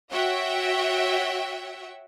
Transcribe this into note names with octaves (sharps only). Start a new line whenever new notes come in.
F#4 C#5 E5 F#5 G5